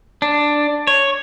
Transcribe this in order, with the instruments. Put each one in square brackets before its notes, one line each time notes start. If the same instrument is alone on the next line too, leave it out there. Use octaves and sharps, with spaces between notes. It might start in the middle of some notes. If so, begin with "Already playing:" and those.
[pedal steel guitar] D4
C#5